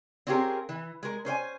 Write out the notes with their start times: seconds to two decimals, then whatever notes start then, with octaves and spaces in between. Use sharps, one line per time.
0.27 C4 C#4 F4 G4 G#4 A#4
0.69 E3
1.03 G#3 A#4
1.25 C#4 C5 D5 G#5